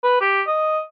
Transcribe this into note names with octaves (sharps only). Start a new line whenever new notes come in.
B4
G4
D#5